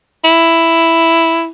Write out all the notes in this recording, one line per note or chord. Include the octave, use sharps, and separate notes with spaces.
E4